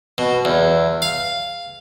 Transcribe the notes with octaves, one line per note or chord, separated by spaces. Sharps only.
B2
E2
F5